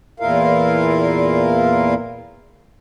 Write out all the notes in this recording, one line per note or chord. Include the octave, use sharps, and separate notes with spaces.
E2 A#2 E4 F4 A#4 F5